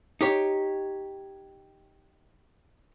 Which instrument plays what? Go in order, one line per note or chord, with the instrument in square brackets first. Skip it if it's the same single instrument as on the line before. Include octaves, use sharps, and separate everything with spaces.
[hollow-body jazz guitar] D#4 G4 C#5